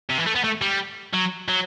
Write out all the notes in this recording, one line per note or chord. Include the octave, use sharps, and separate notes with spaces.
C3
E3
A3
B3
A3
G3
F#3
F#3